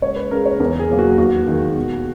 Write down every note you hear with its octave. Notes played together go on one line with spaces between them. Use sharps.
C#2 C#5
B4
C#3 G#3 A#4
C#5
E2 A#4
G#4
B2 F#3 A#3
F#4
D#2 F#4
D#3 G#3
B2